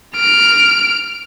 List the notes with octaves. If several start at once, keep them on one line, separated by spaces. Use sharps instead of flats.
F6 D7